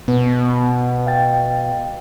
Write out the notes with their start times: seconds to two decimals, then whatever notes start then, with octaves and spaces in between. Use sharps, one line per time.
0.08 B2 B3
1.06 F5 G5 A6